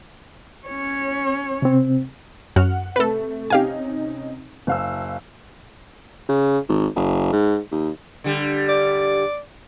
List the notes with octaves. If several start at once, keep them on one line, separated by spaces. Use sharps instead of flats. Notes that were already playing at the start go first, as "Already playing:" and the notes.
C#4 C#5
C3 C4
F#2 F#4 F#5 F6
C3 A3 A4 B4
C3 C#4 D#4 G4 F5 G#5
F#1 F5 E6
C#3
G#1
F#1
G#2
D#2
D3 G3
D5